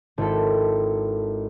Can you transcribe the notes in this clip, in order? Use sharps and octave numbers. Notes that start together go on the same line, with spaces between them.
G#1 E4 A4